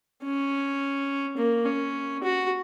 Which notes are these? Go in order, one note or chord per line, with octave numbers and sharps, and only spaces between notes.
C#4
A#3
C#4
F#4